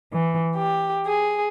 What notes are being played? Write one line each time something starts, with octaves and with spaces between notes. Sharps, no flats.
E3
G4
G#4